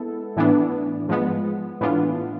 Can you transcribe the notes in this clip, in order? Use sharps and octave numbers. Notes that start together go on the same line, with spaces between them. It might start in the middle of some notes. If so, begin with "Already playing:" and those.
Already playing: G#3 B3 E4 A4
A2 E3 B3 D4
G#2 F3 G#3 B3
A2 E3 B3 D4 F4